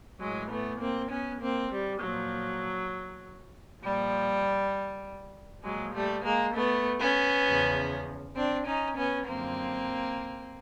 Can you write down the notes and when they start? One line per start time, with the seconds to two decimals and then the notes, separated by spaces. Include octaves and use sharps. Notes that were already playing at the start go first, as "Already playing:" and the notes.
0.20 A2 E3 F#3 G#3
0.50 A3 B3
0.80 A#3 C4
1.11 B3 C#4
1.41 A#3 C4
1.72 G3
2.01 A#2 F3 F#3
3.82 A#2 F3 G3
5.64 A#2 F3 F#3 G#3
5.94 G3 A3
6.24 G#3 A#3
6.55 A3 B3
7.00 B3 C#4
7.45 E2 C#3 F3
8.36 C4 D4
8.66 C#4 D#4
8.96 B3 C#4
9.26 F#2 D3 F3 A#3 C4